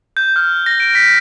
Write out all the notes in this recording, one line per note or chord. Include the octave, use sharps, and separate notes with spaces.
G6
F6
A#6
D7
B6